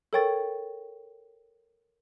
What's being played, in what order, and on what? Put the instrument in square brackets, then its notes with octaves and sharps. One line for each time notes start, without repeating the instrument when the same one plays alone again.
[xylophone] A4 A#4 C#5 G5 C#6 A6